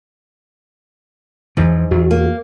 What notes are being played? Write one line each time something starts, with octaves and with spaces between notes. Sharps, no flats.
E2 G#2 E3 F3
E2 F#4
A#3